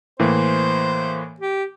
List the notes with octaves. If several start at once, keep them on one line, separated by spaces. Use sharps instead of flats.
A2 E3 A#3 C5
G4